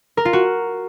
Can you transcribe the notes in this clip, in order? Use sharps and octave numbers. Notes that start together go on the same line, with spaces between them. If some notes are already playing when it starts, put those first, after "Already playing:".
A#4
F4
F#4